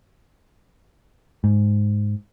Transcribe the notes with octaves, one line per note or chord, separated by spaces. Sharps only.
G#2